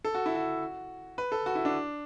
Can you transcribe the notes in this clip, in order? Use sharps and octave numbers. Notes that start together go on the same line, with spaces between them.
A4
F#4
E4
F#4
B4
A4
F#4
E4
D4